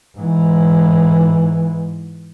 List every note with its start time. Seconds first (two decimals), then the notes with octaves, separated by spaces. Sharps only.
0.17 G#2 E3